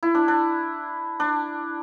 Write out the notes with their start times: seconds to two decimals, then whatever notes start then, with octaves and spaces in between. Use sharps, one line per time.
0.03 E4
0.15 D4
0.28 D4
1.20 D4